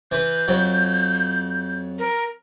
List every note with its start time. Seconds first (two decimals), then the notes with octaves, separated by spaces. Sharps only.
0.12 E3 B4 G6
0.48 F2 F#3
1.99 A#4